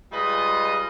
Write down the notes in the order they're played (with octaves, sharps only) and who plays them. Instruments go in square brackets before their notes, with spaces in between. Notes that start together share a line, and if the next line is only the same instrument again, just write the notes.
[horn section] G3 G#3 F4 B4 D#5